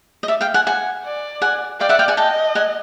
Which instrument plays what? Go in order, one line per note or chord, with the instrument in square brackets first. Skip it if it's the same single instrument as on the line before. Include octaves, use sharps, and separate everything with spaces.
[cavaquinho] D#5
D5 E5
F5 G5
F#5 G#5
F#5 G#5
[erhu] D5
[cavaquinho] F#5 G#5
[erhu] D5 [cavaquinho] F5 G5
[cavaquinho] E5 F#5
F5 G5
F#5 G#5
[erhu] D#5 [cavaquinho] G5 A5
[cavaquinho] F#5 G#5